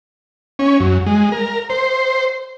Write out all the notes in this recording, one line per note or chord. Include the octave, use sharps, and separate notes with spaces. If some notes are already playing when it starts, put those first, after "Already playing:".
C#4
F#2
G#3
A#4
C5